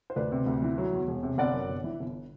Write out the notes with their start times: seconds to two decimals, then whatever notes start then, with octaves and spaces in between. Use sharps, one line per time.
0.10 C5
0.16 D2 B4 D5
0.32 C3
0.46 D2
0.62 E3
0.78 F#3
0.93 E2
1.08 E1
1.23 C3
1.38 G1 D5 F#5
1.53 F#2
1.69 G1
1.84 E3
2.00 G1